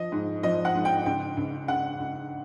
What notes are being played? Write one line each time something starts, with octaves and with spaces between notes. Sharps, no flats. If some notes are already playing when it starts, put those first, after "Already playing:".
Already playing: F3 D#5
G#2
F3 D#5
F#5
G#2
G5
C#2 G5
C#2
C#2 F#5
C#2